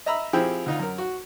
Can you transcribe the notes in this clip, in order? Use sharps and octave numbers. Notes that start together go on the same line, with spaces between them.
D#5 E5 A#5 B5 E6
F3 C4 E4 G4 G#4 G5
D2 D#4 F4
F#2 A#4
F#4